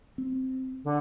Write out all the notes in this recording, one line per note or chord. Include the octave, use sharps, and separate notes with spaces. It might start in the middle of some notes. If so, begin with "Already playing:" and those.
C4
D3